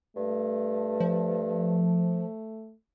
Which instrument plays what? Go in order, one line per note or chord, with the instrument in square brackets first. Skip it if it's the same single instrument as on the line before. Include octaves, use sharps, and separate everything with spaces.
[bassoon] G2 [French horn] A3
[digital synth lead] F3